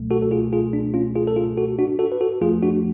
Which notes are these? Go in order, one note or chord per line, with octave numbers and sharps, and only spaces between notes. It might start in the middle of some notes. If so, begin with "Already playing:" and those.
Already playing: C#2 B2 F#3 A3
F#4 A4
A4
F4 G#4
F4 G#4
D4
C#4 F4
F4 G#4
A4
F4 G#4
F#4 A4
D4 F#4
F#4 A4
B4
F#4 A4
F2 F3 A3 F4 G#4
D4 F#4